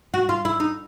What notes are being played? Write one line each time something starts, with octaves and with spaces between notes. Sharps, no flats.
F#4
F4
E4
D#4